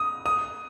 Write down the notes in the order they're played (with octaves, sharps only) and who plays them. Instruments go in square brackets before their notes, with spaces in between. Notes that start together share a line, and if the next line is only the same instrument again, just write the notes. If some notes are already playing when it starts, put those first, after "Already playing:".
Already playing: [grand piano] D#6
D#6